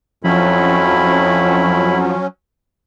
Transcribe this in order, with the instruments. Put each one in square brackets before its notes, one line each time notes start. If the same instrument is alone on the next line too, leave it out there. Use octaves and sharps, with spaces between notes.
[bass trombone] F2 [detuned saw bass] F3 [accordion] F#3 C#4 [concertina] E4 B5